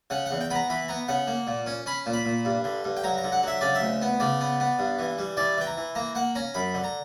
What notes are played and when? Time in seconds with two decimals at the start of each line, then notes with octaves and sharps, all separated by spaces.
0.10 C#3 F#5
0.26 F#5
0.31 E2
0.41 G5
0.51 B3 B5
0.55 A#5
0.70 E3 B5
0.88 B3 A#5
1.08 C#3 F#5
1.27 A#3
1.47 A#2
1.66 C#4
1.86 C#4 B5
2.06 A#2
2.13 B5
2.25 A#2
2.45 G2
2.64 D3
2.85 G2
2.97 G5
3.04 F#3 A#5
3.18 A#5
3.24 D3
3.32 F#5
3.43 F#3 E5
3.61 C#3 D5
3.75 E5
3.81 D2
4.02 B3
4.20 C#3 D5
4.41 B3
4.60 B3
4.79 G2
4.99 E3
5.18 G3
5.37 E3 D5
5.57 E3 G5
5.66 A#5
5.77 E3
5.95 A#3 A#5
6.15 A#3 F#5
6.35 C#4 A#5
6.54 F#2 B5
6.74 D3
6.84 A#5